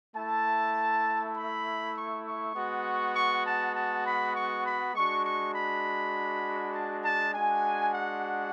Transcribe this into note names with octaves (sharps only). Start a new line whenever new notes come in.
A3 E4 A5
B5
C#6
C#6
G#3 B3 F#4
C#6
A5
A5
B5
C#6
B5
G#3 D4 F#4 C#6
C#6
B5
A5
A5
G#3 D4 F#4 G#5
F#5